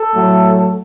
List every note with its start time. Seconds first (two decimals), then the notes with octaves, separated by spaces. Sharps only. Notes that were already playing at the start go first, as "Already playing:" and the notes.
Already playing: A4
0.14 A2 F#3 A3